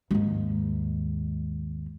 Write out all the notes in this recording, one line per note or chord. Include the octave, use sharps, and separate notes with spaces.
D#2 G#2